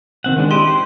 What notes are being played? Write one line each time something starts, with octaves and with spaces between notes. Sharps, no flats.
D#3 C4 F#5
D#3 G#3 D4
E4 G4 D#5 C6
C5